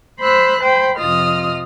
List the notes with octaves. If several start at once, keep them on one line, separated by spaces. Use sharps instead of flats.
C5 B5 E6 F#6
C5 G5 B5
F2 C3 F4 D#5 D#6 F6